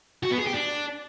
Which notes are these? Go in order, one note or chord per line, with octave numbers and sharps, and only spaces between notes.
F#4
B3
G#4
G4
D4